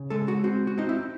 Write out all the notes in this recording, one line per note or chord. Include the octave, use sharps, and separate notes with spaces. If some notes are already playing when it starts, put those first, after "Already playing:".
Already playing: C#3
G#3 A4
F#4
C4 F#4
F#4
C4 D#4
E4